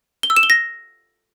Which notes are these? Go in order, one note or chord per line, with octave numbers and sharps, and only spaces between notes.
G7
E6
E7
G7
A#6